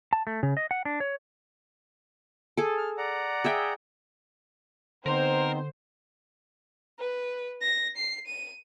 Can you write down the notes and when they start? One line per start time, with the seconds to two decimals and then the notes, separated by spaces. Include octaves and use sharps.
0.13 A5
0.27 A3
0.43 C#3
0.57 D#5
0.71 F#5
0.85 D4
1.00 C#5
2.57 G#4 A4
2.78 F6
2.98 D5 F#5 A#5
3.44 G#4 E5 G5
5.06 D3 B3 C4 D#4 A#4 C5 A#5
6.99 B4
7.61 A#6
7.97 C7
8.27 D#7